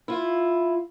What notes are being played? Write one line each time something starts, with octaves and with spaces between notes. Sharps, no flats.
E4 F4